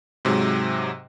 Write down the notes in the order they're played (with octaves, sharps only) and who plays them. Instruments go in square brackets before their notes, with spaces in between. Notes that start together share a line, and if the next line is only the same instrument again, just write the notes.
[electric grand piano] G#2 C3 F#3 G#3